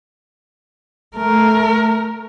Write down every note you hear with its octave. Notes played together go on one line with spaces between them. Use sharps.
A3 A#4